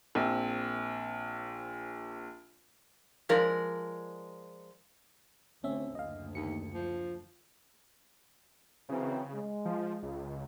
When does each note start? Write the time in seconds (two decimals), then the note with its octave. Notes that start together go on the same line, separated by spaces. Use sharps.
0.15 A#1 C4
3.29 F3 G#3 A#4 D5
5.64 D2 C4 C#4 E5
5.95 F#1 D2 D#5 F5
6.35 D#2 C#7
6.74 F3
8.89 C#3 E3 F#3 C4
9.34 G#3
9.65 F3
10.03 C#2